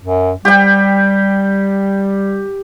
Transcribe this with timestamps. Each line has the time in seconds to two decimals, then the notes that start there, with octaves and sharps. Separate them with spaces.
0.02 F#2
0.45 G3 G4 G5